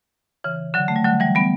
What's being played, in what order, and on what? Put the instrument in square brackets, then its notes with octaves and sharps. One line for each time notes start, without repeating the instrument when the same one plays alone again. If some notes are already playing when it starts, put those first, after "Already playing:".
[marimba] C#3 E3
D3 F#3
A3
G3
D3 F#3
E3 G3
G3 B3